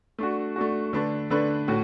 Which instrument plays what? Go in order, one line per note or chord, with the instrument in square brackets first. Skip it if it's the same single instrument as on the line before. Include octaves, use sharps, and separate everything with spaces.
[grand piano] A3 D4 F#4
A3 D4 F#4
D3 A3 D4 B4
D3 A3 D4 B4
A2 A3 F#4